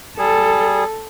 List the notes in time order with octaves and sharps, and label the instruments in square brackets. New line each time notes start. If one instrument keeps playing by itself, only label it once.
[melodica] G3 G#4 [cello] A4